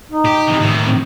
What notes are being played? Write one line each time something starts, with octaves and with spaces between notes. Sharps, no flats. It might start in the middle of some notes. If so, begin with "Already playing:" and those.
D#4
G4
C3 E3
A2 D#3
C4